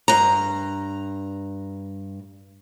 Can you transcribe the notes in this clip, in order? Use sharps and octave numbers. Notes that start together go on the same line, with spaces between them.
G2 A#5